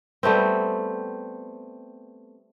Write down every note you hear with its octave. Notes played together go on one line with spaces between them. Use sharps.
G3 A3 B3 C4